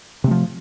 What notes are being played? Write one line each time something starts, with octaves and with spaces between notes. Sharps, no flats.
C3 F3 A3